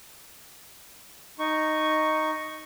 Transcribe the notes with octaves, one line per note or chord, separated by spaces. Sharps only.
D#4 C#6